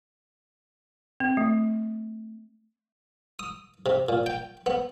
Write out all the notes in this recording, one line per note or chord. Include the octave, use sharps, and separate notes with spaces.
C4
A3
D#6
C3
A#2
G5
B3